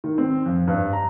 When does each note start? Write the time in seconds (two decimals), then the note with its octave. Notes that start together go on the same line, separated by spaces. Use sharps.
0.04 D#3
0.18 C4
0.46 F2
0.68 G2
0.93 A#5